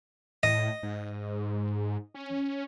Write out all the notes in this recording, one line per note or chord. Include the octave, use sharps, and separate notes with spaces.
A2 D#5
G#2
C#4